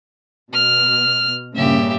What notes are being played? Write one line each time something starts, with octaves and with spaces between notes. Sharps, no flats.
B2 F6
G2 A#2 C#3 G4 E5